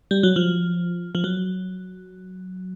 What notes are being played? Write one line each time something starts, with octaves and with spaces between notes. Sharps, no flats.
G3
F#3
F3
F3
F#3